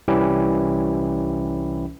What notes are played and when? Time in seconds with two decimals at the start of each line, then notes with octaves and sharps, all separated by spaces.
0.08 C2 E3 G3 C#4 E4 G4